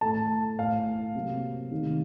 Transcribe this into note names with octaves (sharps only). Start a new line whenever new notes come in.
A2 A3 A5
A2 A3 F5
C3 F#3 A#3
C3 D#3 A3